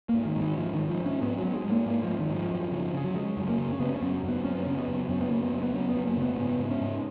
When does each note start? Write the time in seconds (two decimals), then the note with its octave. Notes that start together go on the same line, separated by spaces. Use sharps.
0.09 G#2 A#3
0.26 D#3
0.36 G#2 D#3
0.57 G#2 F3
0.74 D#3
0.79 G#2
0.89 F3
1.00 G#2
1.06 C#4
1.22 G#2 B3
1.38 F#3
1.43 G#2
1.54 G#3
1.65 G#2
1.70 A#3
1.86 G#2 A#3
2.03 F3
2.09 G#2
2.19 D#3
2.30 G#2
2.35 F3
2.51 F#2
2.72 C#3
2.94 C#3
3.04 F#3
3.15 C#3 G#3
3.37 F#2
3.48 A#3
3.58 C#3
3.72 C#4
3.80 C#3 B3
3.96 C#4
4.02 F#2
4.24 F#2 B3
4.45 F#2 C#4
4.54 B3
4.64 C#3 C#4
4.77 B3
4.88 F#2
5.09 F#2 C#4
5.21 B3
5.31 C#3 A#3
5.42 B3
5.52 F#2
5.63 B3
5.73 F#2 C#4
5.89 B3
5.96 F#2
6.06 A#3
6.17 C#3
6.22 B3
6.38 G#2 B3
6.60 G#2
6.70 C#4
6.82 G#2